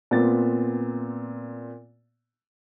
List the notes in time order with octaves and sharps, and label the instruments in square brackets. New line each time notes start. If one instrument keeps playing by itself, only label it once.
[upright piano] A#2 B3 C4 A6